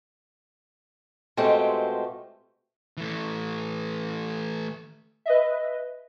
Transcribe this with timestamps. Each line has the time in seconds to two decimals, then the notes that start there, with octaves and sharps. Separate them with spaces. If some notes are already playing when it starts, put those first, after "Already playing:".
1.37 B2 G#3 A3 C4 F4 G4
2.97 E3 A3
5.26 B4 D#5 E5